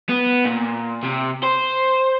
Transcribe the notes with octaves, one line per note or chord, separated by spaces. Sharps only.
B3
A#2
C3
C5